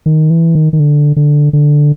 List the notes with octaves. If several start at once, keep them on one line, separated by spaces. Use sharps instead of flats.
D#3
E3
D#3
D#3
D3
D3
D3